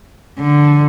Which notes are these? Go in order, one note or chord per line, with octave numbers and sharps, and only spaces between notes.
D3